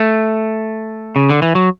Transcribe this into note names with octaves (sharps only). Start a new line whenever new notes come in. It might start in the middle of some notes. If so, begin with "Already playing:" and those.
Already playing: A3
C#3
D3
E3
F#3